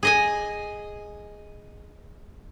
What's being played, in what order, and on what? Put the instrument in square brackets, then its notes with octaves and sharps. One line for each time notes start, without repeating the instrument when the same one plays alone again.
[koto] G#4 D#5 G#5